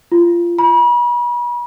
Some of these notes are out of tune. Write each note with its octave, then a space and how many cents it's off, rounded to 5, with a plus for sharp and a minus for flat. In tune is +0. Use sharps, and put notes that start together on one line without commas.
F4 -20
B5 -40